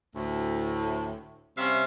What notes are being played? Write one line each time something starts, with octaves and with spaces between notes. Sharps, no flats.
D2 A2
C3 G3 C#4 E5 F5